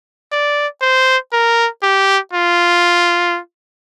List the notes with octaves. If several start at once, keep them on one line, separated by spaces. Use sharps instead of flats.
D5
C5
A#4
G4
F4